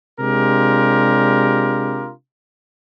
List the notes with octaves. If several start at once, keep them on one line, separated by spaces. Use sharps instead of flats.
C3 G#3 D4 F4 G4 A#4